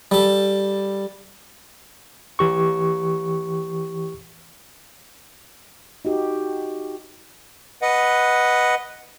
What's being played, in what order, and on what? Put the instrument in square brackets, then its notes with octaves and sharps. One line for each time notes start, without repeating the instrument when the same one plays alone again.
[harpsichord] G3 A4
[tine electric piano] E3 G4 C#6
[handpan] D#4 F#4 G4
[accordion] B4 D#5 F#5